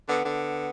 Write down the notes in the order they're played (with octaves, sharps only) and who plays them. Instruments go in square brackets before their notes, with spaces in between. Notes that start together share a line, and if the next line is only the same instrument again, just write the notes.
[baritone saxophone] D3 [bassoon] B3
[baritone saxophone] D3 [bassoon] B3